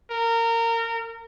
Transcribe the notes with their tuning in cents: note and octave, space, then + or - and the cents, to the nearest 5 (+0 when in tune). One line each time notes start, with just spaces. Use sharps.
A#4 -25